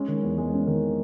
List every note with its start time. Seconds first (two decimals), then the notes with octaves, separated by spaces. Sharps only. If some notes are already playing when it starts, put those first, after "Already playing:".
Already playing: G#3 C#4
0.08 D#3
0.23 E2
0.38 G#3
0.53 C#4
0.67 D#3